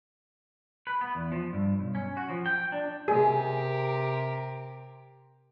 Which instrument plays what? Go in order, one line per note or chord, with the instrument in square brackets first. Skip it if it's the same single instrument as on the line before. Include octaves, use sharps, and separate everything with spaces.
[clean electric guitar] B4
B3
E2
F3
G2
B1
C#4
F#4
F3
G5
D4
[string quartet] C3 G4 A#4 [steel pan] G#4